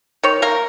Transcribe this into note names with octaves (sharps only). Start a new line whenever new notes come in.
D#3 C#5
A#3 A#4